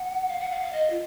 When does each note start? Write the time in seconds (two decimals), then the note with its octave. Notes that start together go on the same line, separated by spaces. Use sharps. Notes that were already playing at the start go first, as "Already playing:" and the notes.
Already playing: F#5
0.28 F5
0.39 F#5
0.50 F5
0.62 F5
0.72 D#5
0.89 F4